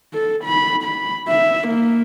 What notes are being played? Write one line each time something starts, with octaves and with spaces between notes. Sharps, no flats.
A4
B5
B5
E5
A#3